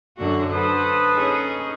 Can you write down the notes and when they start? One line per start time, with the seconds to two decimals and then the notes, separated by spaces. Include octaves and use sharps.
0.18 F#2 D3 F#4
0.52 A4 B4 C5 D#6
1.15 C#4 D#4 G#4